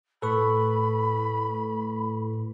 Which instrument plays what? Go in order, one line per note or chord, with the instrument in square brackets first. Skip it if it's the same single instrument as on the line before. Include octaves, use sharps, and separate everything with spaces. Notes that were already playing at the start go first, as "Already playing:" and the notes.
[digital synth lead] A2 [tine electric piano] A4 B4 C#6 [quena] B5